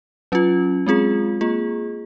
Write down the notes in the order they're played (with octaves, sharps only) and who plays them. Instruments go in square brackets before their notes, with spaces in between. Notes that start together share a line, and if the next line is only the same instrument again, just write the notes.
[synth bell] F#3 C#4 F4
G#3 C4 F4 G#4
A#3 F4 G#4